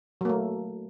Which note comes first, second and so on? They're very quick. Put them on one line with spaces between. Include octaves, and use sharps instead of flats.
F#3 A#3 A3